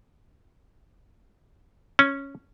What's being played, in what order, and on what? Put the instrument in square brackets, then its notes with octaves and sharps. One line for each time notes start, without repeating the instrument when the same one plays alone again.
[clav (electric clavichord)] C#4